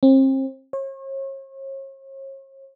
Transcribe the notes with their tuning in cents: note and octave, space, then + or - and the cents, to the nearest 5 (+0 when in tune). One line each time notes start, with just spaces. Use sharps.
C4 +35
C#5 -40